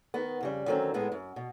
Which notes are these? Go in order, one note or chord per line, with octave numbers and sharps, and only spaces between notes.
D#3 B3
F2 C#3 G3
D3 D#3 F#3 A3 C4 C#4
A2 G#3 B3 D#4 E4
F#2
B2